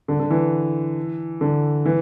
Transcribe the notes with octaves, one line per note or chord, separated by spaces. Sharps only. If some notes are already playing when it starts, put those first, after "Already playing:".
D3
D3
E3
D3
E3